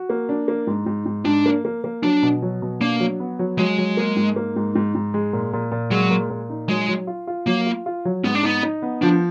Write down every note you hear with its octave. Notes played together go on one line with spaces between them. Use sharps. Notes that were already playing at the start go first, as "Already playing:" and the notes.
Already playing: F#4
A#3
D4
A#3
G#2
G#2
G#2
G#2 D4
A#3
A#3
A#3
F#3 D4
B2
F#3
B2
A#3 D4
F#3
B3
F#3
F#3 G#3
F#3
A#3
G#2
A#3
G#2
G#2
G#2
G#3
A#2
A#2
A#2
F#3 G#3
A#2
A#2
D#4
F#3 G#3
F#3
F4
F4
F#3 A#3
F4
F4
F#3
G#2 B3
D4
B3 D#4
D#4
B3
F3 D4